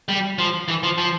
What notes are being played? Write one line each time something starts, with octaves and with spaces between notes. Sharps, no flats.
G3
F3
E3
F3
F3